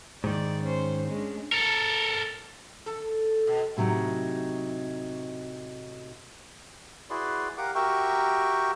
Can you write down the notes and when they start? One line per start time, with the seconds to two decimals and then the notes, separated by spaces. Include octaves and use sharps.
0.24 G#2 D#3 D5
0.63 C#4 C5
1.08 G#3 C#4 D4
1.52 A4 A#4
2.86 A4
3.47 B2
3.77 A2 C3 F#3 D#4
7.10 E4 F#4 G#4 B4 D5 C6
7.58 G4 A#4 F5 F#5 D6
7.75 F#4 G4 A#4 E5 G5 C#6